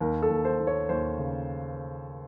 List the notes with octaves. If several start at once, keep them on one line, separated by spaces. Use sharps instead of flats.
D#2 A#4
A4
D#2
C5
D#2
C#5
D#2 C5
C#3